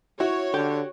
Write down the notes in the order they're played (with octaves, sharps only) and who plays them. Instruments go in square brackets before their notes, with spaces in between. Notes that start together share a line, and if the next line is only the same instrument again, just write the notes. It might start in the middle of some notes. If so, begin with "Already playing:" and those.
[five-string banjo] E4 [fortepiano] F#4 [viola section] C#5
[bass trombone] D3 [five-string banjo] G4